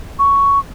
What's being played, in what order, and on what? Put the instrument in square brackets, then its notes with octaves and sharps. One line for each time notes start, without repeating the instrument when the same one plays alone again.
[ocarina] C#6